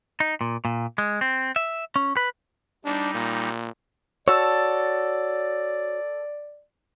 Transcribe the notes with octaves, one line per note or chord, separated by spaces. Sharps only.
D#4
A#2
A#2
G#3
C4
E5
C#4
B4
G3 D4 D#4
A#2
F#4 A4 C#5 D5 E6